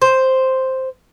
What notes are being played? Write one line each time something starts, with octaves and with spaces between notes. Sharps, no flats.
C5